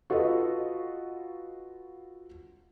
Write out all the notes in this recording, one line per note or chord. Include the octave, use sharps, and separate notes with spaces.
F4 F#4 A4 B4 D#5